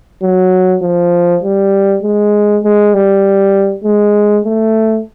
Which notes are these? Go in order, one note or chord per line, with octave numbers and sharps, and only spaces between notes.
F#3
F3
G3
G#3
G#3
G3
G#3
A3